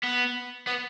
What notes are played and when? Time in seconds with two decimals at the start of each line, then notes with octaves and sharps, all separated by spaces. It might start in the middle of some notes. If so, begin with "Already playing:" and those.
0.04 B3
0.67 B3